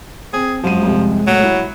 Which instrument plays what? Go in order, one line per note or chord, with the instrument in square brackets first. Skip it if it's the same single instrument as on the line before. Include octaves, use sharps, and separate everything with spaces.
[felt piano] C4 [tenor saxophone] G#4
[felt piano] F#2 F#4 D#7 [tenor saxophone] F3 [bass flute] G#3
[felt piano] C2 F2 C3
[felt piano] A2 [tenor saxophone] F#3
[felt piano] E4